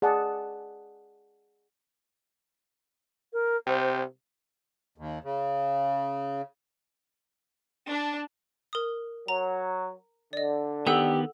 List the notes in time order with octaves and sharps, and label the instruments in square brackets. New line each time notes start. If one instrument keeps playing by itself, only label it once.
[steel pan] G#4 D5 F#5 A5
[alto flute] A#4
[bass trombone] C3 [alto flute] C5
[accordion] D#2
C#3
[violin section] D4
[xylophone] A#4 D#6
[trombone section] F#3 [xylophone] A#5
[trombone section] D3 [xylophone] D5 D#5
[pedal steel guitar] D#3 B3 [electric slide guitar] G4 [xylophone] A4 F#5 E6